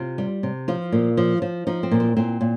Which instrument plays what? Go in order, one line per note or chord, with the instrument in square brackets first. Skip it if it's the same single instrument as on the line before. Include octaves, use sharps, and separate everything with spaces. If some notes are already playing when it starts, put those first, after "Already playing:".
Already playing: [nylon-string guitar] C3 F4
G3
C3
F3 F4
A#2
F3
F3
F3 D#4
C4
A#2
C4
A#2 C4
A#2